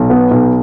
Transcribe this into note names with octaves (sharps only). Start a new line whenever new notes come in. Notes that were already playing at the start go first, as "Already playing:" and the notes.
Already playing: B1
B3
B1